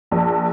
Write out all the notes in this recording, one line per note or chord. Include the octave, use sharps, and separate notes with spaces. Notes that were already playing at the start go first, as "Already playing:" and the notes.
A#1